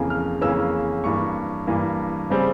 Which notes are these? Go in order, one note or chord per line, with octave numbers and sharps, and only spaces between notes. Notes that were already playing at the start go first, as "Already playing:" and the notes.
Already playing: F2 C#3 E3 A#3 C#4
F6
F2 C#3 E3 A#3 C#4 E6
G2 E3 A#3 C#6
G2 E3 A#3
C#3 G3 C4